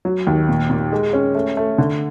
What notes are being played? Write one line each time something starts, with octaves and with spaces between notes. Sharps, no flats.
F#3
D#2
A#2
A#2
G#3
C#4
A3
A3
D3